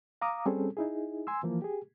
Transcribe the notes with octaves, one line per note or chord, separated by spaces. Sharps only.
F5 A#5 D6 D#6
G3 C4 C#4 G#4 A4
D#4 E4 G#4
G#5 C6 E6
E3 F3 A#3
G4 G#4